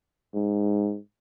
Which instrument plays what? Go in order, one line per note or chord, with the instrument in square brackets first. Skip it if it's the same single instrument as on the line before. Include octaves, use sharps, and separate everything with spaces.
[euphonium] G#2